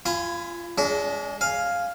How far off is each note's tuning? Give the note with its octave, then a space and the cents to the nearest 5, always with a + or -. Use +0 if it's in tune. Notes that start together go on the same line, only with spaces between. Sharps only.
F4 -25 G#5 +0 B5 +25
G#3 +0 D4 -40
F5 +0 G#5 +0